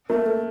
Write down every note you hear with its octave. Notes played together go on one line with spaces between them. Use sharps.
A3 A#4
A#3
A4